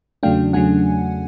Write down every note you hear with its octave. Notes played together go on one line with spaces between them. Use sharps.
E2 C#3 F#3 A3 D4 F5 G5
E2 C#3 F#3 A3 D4 F#5 G#5